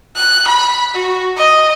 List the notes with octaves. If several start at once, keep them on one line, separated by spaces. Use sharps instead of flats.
F#6
B5
F#4
D#5